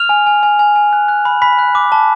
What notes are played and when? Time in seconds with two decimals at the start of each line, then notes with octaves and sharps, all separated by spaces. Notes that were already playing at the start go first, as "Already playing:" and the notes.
Already playing: F6 F7
0.09 G#5
0.27 G#5
0.43 G#5
0.59 G#5
0.76 G#5
0.93 F#6
1.08 F#6
1.25 B5
1.42 B5 B6
1.59 F#6
1.75 D6
1.92 A5